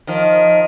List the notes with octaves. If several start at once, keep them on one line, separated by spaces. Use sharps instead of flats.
D#3 F3